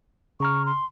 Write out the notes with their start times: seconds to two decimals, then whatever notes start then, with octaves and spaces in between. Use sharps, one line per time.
0.40 C#3 A#5 C#6 F6
0.66 C6